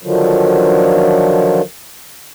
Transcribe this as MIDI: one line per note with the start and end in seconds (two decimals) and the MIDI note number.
0.03 1.61 50
0.03 1.61 51
0.03 1.61 53
0.03 1.61 54